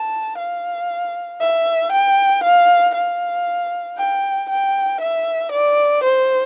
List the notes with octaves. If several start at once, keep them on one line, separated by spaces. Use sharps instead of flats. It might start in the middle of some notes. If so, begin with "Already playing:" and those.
Already playing: A5
F5
E5
G5
F5
F5
G5
G5
E5
D5
C5